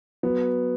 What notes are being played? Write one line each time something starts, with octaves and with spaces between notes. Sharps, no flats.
F#3 B3